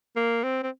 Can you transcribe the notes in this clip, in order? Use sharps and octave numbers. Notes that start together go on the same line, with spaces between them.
A#3
C4
C4